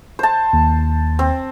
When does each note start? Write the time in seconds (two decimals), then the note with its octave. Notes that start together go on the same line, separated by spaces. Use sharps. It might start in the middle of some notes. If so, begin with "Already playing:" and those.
0.19 C5 A5
0.53 D#2
1.19 C4